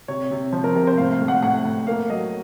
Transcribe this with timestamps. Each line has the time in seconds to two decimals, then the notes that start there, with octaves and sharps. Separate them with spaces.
0.08 C3 C#5
0.31 C3
0.53 F3 C5
0.64 A#4
0.75 C3 A#4
0.87 C5
0.97 A2 F5
1.12 F5
1.21 A2
1.28 F#5
1.42 A2 F#5
1.65 A2
1.87 A#3 F5
2.10 F#3 D#5